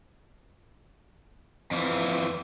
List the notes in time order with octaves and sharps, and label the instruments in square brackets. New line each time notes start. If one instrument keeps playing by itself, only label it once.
[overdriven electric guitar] F2 E3